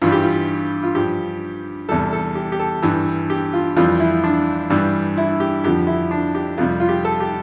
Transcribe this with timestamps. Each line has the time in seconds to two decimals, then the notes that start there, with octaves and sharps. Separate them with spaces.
0.02 G2 E3 G3 F4
0.12 G4
0.23 F4
0.83 F4
0.95 G2 F3 G4
1.89 E2 C3 G3 A4
2.13 A4
2.35 G4
2.52 G4
2.59 A4
2.82 G2 E3 G3
3.30 G4
3.53 F4
3.76 F2 E3 G3 F4
4.00 E4
4.24 D4
4.70 G2 E3 G3
5.17 E4
5.40 G4
5.64 F2 D3 F3 G4
5.87 E4
6.11 D4
6.35 G4
6.58 F2 C3 G3 F4
6.80 F4
6.89 G4
7.05 A4
7.20 G4